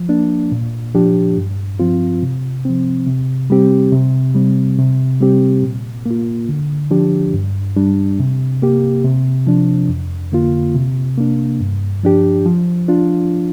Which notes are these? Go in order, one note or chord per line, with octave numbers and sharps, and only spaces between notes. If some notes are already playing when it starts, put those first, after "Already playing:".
Already playing: F3
A#3 D4
A#2
F3 D4 G4
G2
F3 C4 F4
C3
F3 C4
C3
G3 C4 G4
C3
G3 C4
C3
G3 C4 G4
A#2
A#3 F4
D3
F3 D4 G4
G2
G3 D4
C3
A#3 G4
C3
F3 D4
F2
D3 A#3 F4
C3
A#3 D4
G2
F3 D4 G4
F3
D4 F4